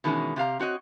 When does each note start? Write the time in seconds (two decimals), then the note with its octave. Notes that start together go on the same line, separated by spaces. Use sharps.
0.04 B2 D#3 E3 G#3 A3 C#4
0.36 C3 G4 F5 A#5
0.59 C4 F#4 C#5 D#5